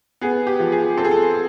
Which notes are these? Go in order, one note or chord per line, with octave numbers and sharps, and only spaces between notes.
B3 G#4
G4
F3
G#4
C4 A4
G#4
A4